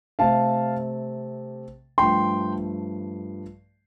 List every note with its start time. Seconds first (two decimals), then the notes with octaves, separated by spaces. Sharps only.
0.19 C3 A3 C4 F5 A5
1.98 G2 F3 A3 G5 C6